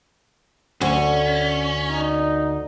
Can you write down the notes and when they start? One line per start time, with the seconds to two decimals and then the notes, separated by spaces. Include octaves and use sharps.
0.81 D2 C#4 D5
1.90 D#4 D5